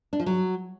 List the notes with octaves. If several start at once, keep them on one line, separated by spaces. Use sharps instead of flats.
D4
F3
F#3